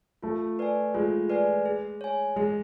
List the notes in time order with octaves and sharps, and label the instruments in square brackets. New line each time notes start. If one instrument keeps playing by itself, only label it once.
[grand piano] A3 [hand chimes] F4
[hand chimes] B4 D5 G#5
[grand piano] G#3 [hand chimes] F4
[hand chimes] B4 D5 G#5
G#4
C#5 G#5
[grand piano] G#3 [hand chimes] G#4